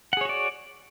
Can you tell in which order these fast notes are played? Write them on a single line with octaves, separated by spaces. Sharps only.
F#5 G#4 C#5 F#4 D5